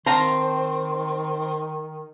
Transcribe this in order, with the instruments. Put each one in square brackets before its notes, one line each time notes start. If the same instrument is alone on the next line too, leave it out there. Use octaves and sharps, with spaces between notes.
[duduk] D#3 [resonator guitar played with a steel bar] C4 [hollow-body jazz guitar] C5 F5 A#5 [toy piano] A5